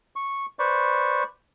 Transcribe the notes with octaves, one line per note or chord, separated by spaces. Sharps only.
C#6
B4 C5 D5 C#6